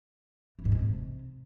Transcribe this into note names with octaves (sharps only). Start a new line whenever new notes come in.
E3
G#2
G#3
C3